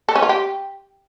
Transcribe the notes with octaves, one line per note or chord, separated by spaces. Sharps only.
A4
C#4
F4
G4